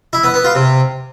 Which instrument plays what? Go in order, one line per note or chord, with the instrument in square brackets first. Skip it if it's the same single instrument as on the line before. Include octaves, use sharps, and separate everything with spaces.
[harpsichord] E4
B3
B3
F4
C3